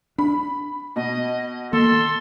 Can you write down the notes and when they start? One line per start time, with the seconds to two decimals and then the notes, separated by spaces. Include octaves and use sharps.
0.18 D4 B5
0.96 B2 D#5
1.73 D#3 A#3 A4 C6